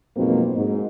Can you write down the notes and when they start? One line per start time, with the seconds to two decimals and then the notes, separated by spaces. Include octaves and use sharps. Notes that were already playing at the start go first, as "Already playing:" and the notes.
0.16 F2 G#2 B2 F#3 A#3 C4
0.55 G#2